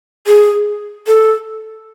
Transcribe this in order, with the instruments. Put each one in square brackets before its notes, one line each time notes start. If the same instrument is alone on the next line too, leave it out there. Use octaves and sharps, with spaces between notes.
[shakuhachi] G#4
A4